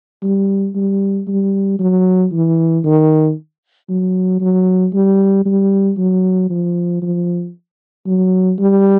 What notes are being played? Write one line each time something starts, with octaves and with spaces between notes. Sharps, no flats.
G3
G3
G3
F#3
E3
D#3
F#3
F#3
G3
G3
F#3
F3
F3
F#3
G3